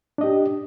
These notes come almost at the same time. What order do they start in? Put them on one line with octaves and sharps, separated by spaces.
D4 D#5 G4